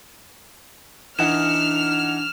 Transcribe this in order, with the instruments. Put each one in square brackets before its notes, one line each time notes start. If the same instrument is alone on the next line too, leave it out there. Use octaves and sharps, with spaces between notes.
[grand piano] E3 D#4 F#5 [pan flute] D4 [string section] F6 [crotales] E7